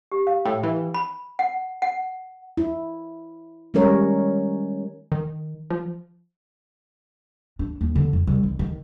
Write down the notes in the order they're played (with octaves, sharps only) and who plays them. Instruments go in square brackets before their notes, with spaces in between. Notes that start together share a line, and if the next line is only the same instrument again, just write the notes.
[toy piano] G4
F5
[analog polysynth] A2 [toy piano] G5
[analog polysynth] E3
[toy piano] B4
B5
F#5
F#5
[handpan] E4
D#3 G3 G#3 C#4 A#4 C#5
[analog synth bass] D#3
F3
[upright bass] D4
D#2
D3
F2
C2
D#3
D#3